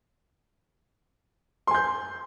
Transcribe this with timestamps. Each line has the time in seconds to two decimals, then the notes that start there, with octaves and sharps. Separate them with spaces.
1.67 C6
1.71 G#5
1.75 G6